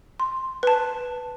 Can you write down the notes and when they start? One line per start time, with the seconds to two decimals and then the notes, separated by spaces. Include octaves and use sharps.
0.20 C6
0.63 B4 A5